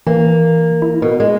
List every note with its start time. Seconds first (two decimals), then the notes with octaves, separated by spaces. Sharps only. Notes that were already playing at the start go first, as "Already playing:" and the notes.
0.07 E3 A#3
0.82 E4
1.02 B2 A#4
1.20 G#3